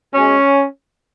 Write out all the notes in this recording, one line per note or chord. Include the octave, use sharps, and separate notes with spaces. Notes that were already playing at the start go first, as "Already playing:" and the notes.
B2 G#3 C#4